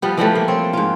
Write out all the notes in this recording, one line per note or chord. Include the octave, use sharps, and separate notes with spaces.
F3 G3 B3
E3 F3 G3 A3
A#3
C4 C#5
G#2 F4